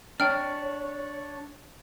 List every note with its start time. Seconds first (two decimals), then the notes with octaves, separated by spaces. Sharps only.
0.20 D4 C#5 G5 F6